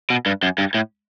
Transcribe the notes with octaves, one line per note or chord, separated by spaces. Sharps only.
B2
G2
F#2
G2
A2